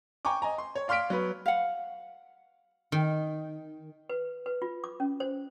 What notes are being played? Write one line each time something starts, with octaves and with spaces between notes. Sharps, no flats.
G5 G#5 A#5 C#6 D6
D#5 G#5 A#5
C6
C#5
D5 F5 C6 F6 B6 D7
F#3 B3 B4
F5 F#5
D#3
B4
B4
F4
D6
C#4
C5